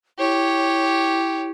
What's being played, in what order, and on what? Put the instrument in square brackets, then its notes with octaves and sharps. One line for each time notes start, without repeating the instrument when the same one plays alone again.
[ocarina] E4 [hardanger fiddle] G4 C#5